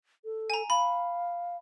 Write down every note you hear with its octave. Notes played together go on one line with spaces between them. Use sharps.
A4
G#5 A#5
F5 B5